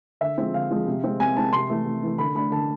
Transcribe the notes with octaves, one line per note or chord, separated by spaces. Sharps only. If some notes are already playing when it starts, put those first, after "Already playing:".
D3 E5
F3 G#3 C4
D3 F5
F3 G#3 C4
C3
G#3 C4
C3 G#5
G#3 C4 A5
C3 C6
E3 A3
C3
E3 A3
D3 B5
A3 D4 B5
D3 A5